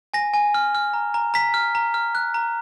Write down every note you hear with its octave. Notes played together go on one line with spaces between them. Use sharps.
G#5 A#6
G#5
F6
F6
A#5
A#5
A#5 B6
F6
A#5
F6
F#6
A#5